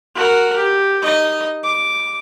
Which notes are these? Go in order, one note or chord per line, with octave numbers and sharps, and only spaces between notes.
F#4 A#4
G4
D#4 D#5
D6